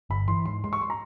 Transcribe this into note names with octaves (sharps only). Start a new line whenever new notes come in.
G1 B5
E3 C6
G#2 C6
G#3 C6
C#6
C6
A#5